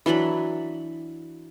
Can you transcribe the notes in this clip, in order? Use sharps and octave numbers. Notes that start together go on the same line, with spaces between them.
E3 F#3 D4 B5